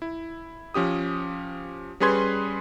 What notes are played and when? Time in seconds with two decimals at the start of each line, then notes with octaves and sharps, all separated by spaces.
0.02 E4
0.74 F3 C#4 G4 D#6
2.00 G3 C#4 G#4 B4 C6 G#6